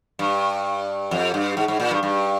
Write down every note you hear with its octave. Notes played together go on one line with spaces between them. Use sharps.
G2
F2
G2
G#2
G#2
A#2
G2
G2